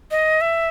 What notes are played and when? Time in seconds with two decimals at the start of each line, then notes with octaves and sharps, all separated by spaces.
0.11 D#5
0.41 E5